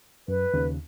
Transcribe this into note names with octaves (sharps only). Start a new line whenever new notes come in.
F#2 B4
D#2 C#3